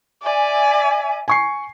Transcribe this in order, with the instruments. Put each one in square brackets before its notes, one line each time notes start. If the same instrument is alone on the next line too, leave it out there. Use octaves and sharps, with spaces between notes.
[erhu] D5 [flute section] E5 G#5
[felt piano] G#5 C#6 C7